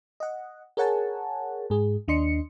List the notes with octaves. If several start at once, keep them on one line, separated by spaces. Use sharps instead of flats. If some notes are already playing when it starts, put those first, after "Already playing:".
D#5 F#5
G#4 A#4 C#5 F#5 G#5 A5
G#2 G#4
D#2 D4 D#5 C6 C#7